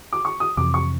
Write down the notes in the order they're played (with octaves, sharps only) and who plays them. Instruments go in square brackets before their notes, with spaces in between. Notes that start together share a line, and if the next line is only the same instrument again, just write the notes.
[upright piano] D6
C#6
D#6
[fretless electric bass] F2 C3 E3 [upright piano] D6
[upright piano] C#6